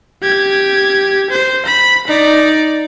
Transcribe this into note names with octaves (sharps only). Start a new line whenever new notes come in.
G4 G#6
C5
B5
D#4 D5